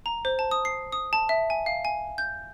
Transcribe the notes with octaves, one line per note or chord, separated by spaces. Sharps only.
A#5
C5
A5
D#6
C7
D#6
A5
E5
G#5
F5
G#5
G6